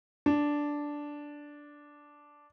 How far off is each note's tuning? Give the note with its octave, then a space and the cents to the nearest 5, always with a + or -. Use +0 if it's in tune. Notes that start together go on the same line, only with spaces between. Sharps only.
D4 -5